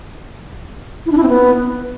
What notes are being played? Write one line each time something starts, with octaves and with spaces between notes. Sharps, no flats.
E4
D4
E4
C4
B3